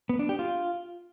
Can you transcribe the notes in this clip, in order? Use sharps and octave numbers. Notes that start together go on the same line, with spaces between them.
B3
D4
G4
F4